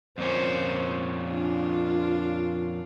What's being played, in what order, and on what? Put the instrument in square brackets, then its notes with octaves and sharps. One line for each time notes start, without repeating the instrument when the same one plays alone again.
[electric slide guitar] F2 A#2 C#4 [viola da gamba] C5
[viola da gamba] D4 F4